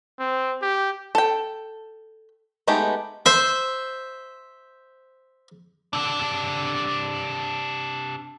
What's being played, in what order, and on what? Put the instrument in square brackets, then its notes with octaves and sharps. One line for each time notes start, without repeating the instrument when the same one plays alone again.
[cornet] C4
G4
[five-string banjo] A4 G5
G#3 A3 B3 D#4 G4
[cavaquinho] C5 [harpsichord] E5
[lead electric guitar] C3 D4